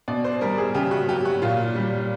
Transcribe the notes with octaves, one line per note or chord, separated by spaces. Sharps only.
B2 D5
C5
G3 A#4
G#4
C#3 G4
F#4
F#3 G4
F#4
A#2 F4
G3